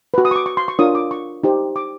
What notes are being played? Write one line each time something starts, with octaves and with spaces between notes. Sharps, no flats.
F#4 B4
D#6
C#6
D6
C#6
C6
C#6
D4 F4 A#4 C#5 D#6
D6
C#6
D#4 G4 C5
D6